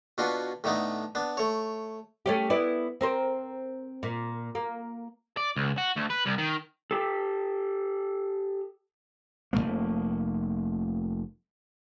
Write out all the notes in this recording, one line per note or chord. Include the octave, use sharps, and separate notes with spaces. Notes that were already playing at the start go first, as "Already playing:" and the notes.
B2 D4 F4 F#4 B4
A2 D3 A3 B3 D#4
B3 D4
A3 C#5
A3 C#4 G4
B3 E4 D5
C4 A#4 C5
A#2
A#3
D5
C#2
F#4
D2
B4
C2
D#3
G4 A4
F1 G2 A3 A#3